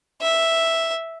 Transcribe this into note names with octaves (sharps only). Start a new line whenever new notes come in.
E5